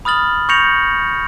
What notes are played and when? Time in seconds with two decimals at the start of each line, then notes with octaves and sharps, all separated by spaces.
0.05 B5 D#6 F6 A6 F#7
0.49 C#6 G6 A#6 C#7 F7 F#7